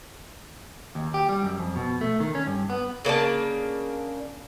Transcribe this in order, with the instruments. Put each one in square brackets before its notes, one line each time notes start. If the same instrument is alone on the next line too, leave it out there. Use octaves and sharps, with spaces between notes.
[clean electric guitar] D#2
G4
G3
F#2
F2
B2
A3
D#3
C#4
G2
B3
[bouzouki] C#3 A#3 D4 A5